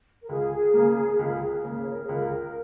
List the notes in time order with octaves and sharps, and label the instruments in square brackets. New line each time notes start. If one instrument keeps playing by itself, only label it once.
[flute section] A#4
[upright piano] C#2 [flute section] G#4
[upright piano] C#3 A#3
[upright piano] C#2 [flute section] G#4
[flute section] A#4
G#4
[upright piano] C#3 A#3
[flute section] C#5
A#4
G#4
[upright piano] C#2 [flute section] A#4